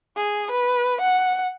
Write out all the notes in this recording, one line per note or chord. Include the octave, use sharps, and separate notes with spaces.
G#4
B4
F#5